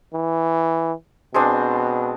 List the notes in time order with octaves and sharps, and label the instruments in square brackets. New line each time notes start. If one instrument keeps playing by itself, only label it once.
[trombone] E3
[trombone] B2 [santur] G#3 C4 D4